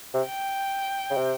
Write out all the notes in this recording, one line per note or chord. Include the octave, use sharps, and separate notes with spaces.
C3
G5
C#3
C3